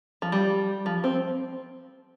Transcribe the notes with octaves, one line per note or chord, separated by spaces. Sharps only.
F3
G3
F3
C4